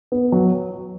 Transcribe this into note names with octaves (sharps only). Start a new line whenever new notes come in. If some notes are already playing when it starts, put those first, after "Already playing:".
B3
F#3